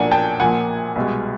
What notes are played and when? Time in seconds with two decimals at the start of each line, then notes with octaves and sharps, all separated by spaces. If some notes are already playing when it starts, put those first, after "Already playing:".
Already playing: B1 A#2 F3 A#3 D4 F#5 G#5
0.11 G5 A5
0.40 A#1 A#2 F3 A#3 F#5 G#5
0.96 C2 B2 G#3